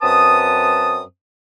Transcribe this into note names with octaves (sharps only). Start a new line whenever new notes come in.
F#2 C4 B4 A5 D#6